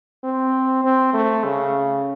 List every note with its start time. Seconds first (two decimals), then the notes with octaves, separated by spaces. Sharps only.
0.24 C4
0.84 C4
1.14 A3
1.44 C#3